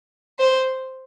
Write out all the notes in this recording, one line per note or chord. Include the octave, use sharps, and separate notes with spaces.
C5